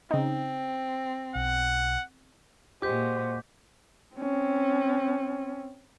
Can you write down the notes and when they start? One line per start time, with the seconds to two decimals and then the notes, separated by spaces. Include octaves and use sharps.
0.11 C#3 C4 D#4
1.35 B1 F#5
2.82 A#2 G#3 F#4 G4 C5 D6 G6 B6
4.15 C4 C#4